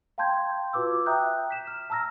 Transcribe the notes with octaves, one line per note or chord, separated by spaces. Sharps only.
F5 G5 A5 C6 G6 G#6
F4 F#4 B4 D6 E6
E5 G5 A#5 D#6 F#6 G6
B6 E7
F6
A5 A#5 E6 F6 A#6